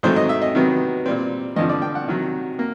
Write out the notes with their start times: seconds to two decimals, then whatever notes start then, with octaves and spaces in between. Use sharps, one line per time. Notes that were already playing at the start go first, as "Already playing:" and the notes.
0.03 G#2 D#3 F#3 A3 C4 C5
0.16 D#5
0.29 E5
0.42 D#5
0.55 C3 D#3 F#3 B3
1.06 A#2 G3 C4
1.56 G2 D3 F3 D#5
1.69 D5
1.82 G5
1.95 F#5
2.08 C3 D#3 F#3
2.59 A#3